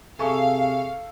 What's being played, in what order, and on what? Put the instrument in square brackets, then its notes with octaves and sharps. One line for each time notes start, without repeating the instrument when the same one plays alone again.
[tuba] C3 [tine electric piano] G#4 E5 G#5 [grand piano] A4 C#6 [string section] F5